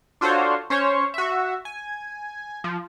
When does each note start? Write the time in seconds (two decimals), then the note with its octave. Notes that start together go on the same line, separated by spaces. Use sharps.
0.21 D4 F4 F#4 A4 C5 C#5
0.70 C#4 C5 C#5
1.14 F#4 E5
1.65 G#5
2.64 F3